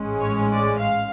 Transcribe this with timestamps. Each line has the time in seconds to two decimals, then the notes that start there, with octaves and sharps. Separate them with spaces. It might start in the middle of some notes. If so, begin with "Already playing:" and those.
Already playing: A1 G#2 G#3 C#4
0.20 C#5
0.51 D5
0.81 F5